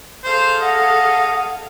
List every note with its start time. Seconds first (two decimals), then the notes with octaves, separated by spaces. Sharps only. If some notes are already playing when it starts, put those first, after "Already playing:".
0.24 G#4 A4 C5 F5
0.62 D#5 F#5